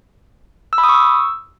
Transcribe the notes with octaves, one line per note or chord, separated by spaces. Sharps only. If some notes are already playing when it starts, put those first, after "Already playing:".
E6
B5
D#6
C#6
E6